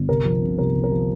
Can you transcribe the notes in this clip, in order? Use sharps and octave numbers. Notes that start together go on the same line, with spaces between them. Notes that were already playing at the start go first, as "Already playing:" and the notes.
Already playing: G1
C2 A#4
F3
C3
C2 A#4
C2
A#4
F3